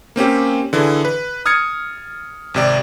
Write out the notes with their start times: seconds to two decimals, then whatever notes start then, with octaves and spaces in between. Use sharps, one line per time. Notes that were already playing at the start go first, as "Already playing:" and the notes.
0.16 A#3 C4 C#4 G4
0.73 D3 E3 G#4
1.05 B4
1.46 D#6 F6 G#6 A6 C#7
2.54 G#1 C3 D5